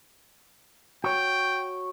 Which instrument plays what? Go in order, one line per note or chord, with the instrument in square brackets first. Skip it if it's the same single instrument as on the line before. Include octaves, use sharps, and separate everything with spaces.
[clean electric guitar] F#4 C#5 [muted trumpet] G5